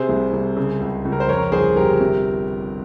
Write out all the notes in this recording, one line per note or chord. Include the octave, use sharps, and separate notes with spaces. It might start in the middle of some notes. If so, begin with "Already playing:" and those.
Already playing: C3 G#4 C5
C2
C2
C#3
C#2
C#2
A#4
C5
F2 A#4 C#5
G1 G#4 C5
G1 G4 A#4
C3